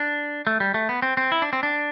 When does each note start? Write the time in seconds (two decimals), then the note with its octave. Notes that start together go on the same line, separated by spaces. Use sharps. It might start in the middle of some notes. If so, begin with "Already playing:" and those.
Already playing: D4
0.47 A3
0.60 G3
0.74 A3
0.89 B3
1.02 C4
1.17 C4
1.32 E4
1.42 D4
1.53 C4
1.63 D4